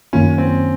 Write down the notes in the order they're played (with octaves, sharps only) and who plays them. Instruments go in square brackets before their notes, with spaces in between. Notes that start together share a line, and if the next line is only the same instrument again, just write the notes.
[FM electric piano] F#2 D#3 A#3 F4 [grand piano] C#4
[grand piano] C4